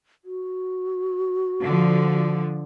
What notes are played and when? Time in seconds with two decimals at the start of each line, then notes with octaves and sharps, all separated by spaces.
0.25 F#4
1.64 D3 F3